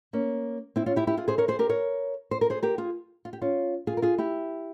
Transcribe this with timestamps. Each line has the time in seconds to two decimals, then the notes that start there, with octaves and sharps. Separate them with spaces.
0.13 A#3 C#4
0.76 C4 E4
0.86 C#4 F4
0.96 E4 G4
1.07 E4 G4
1.17 F4 G#4
1.28 G#4 C5
1.38 A#4 C#5
1.48 G#4 C5
1.59 G4 A#4
1.69 A#4 C#5
2.31 C5
2.41 A#4
2.50 G#4 C5
2.63 G4 A#4
2.78 F4 G#4
3.25 F4
3.33 G4
3.42 C#4 F4
3.87 F4 G#4
3.97 A#4
4.02 F4 G#4
4.18 E4 G4